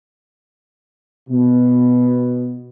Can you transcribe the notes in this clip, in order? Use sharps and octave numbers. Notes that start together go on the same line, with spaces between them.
B2